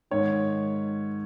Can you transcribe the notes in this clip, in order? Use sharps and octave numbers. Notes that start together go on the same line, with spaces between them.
G#2 D#3 C#5